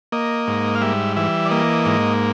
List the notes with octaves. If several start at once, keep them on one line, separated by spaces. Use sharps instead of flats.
A#3 D#5
G#2
F5
G3 E5
E3 E5
D5
A#3 D#5
G#2